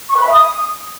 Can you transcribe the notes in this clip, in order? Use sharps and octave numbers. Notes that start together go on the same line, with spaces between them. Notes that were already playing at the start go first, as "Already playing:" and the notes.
C#6
B4
B5
E5
D#6